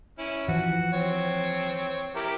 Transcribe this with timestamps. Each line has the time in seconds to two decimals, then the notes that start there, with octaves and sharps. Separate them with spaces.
0.19 C#4 E4
0.49 E3 F3 F#4
0.93 C4 C#5
2.16 E4 G4 A#4